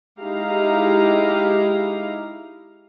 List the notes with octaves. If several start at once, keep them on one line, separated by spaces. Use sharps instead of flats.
G#3 D#4 E4 G4 F5 A#5